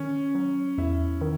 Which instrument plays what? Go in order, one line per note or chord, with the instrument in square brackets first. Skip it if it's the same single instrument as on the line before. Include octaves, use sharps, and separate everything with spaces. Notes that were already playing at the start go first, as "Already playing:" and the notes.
Already playing: [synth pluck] D#3 [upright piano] C#4
[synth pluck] F#3
[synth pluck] E2 [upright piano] E4
[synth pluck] D#3